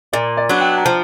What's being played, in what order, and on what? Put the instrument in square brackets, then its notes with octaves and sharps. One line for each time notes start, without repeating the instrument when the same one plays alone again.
[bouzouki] A#2 [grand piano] D5
[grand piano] D5
[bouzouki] F#3 B3 D4
[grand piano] G5
A#5
[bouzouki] F3 [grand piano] A5